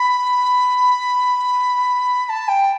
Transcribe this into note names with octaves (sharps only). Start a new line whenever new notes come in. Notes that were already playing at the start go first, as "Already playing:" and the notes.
Already playing: B5
B5
A5
G5